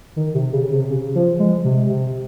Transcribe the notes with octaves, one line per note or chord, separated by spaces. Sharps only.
D#3
C3
C#3
C#3
C3
C#3
F3
G#3
C3
C3